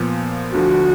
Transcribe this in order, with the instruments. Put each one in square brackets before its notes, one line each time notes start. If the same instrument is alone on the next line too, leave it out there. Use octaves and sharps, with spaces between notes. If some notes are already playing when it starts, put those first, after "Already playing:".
Already playing: [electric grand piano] A#2 F3 B3
[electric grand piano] D2 D3 F3 [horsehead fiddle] F#4